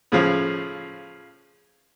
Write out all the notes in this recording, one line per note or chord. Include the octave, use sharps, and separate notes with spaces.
A2 C#3 F3